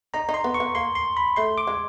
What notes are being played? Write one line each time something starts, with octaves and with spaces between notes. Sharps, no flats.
D#4 A#5
D#4
C6
B3
C#6
B3
A#3 C6
C6
B5
A3 C6
D6
G#3